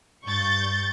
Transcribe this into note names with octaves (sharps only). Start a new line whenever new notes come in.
G2 C#6 G6 A6